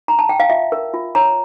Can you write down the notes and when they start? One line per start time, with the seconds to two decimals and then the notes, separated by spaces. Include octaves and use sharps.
0.08 A#5
0.19 A5
0.29 G5
0.40 F5
0.50 F4 E5
0.72 A#4
0.94 F4
1.15 C#5 A#5